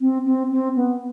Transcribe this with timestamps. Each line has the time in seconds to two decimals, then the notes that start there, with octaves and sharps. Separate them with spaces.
0.01 C4
0.26 C4
0.51 C4
0.76 B3